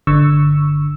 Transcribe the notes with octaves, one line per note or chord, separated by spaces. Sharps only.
G1 D3 C#6 E6